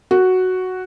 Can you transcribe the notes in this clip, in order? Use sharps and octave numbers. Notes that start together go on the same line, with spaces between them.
F#4